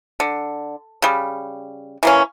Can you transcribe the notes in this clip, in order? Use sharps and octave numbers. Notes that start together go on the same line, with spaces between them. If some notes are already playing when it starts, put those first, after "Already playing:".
D3
C#3 G3
E3 A#3 C#4